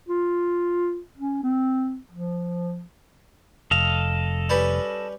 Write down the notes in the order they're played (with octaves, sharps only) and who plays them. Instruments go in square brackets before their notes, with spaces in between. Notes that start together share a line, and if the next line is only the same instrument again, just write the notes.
[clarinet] F4
C#4
C4
F3
[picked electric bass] F1 [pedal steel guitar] A4 D#5 F5
[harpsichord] G3 C#4 B4